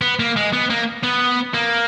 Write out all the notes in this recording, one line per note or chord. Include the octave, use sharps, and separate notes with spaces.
B3
A#3
G#3
B3
A#3
B3
A#3